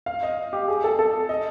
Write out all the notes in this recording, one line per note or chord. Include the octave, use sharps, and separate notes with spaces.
F5
D#5
G4
G#4
A4
A4
D#5